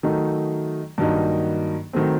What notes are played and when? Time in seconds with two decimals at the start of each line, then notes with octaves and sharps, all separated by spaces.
0.03 D#3 F#3 A3 D#4
0.98 G2 D#3 F#3 A#3 D#4
1.93 D#3 F#3 A3 C4